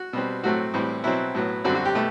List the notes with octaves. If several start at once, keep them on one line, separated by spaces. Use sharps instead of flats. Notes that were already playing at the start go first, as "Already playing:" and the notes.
Already playing: F#4
B2 G3 C4
A2 F#3 A3 C4 F#4
A2 E3 G3 C4
B2 F#3 C4 E4
A2 F#3 B3
F#2 D3 G3 C4 F#4
F#4
G4
B2 A3